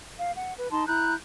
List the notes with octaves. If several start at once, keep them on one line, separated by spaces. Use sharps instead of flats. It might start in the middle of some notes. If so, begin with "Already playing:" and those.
F5
F#5
B4
D#4 A5 C6
E4 A#5 F#6 G6